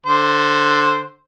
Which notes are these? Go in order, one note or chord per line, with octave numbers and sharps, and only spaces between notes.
D3 C5